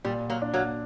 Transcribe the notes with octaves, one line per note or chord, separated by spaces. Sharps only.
A#2 G3
F#3 A#3
D4
F#3 A#3